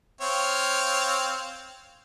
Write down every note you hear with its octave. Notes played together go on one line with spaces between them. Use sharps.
C4 C#5 F5